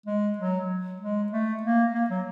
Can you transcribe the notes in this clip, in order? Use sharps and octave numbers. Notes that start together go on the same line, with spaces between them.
G#3
F#3
G#3
A3
A#3
A#3
F#3